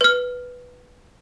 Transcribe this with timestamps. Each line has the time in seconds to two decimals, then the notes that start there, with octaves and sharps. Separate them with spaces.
0.01 B4 F6